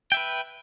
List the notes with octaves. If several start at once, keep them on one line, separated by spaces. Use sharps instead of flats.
B4 E5 G5